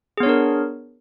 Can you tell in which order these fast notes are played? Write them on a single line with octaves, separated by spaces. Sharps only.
G#4 B3 C#5 D4 A#4